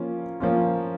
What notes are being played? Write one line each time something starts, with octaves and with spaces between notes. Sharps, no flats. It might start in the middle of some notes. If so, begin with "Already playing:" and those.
Already playing: F3 A#3 C#4 F4
F3 A#3 C#4 F4